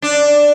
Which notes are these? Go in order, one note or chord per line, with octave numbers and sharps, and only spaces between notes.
D4